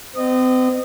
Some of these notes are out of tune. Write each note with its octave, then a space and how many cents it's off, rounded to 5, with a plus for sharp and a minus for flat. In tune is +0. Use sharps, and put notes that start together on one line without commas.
C4 -40 D#5 -25